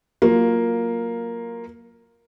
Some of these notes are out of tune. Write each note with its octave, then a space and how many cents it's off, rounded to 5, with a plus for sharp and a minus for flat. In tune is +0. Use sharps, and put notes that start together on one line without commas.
F#3 +0 A#3 +0 F4 +10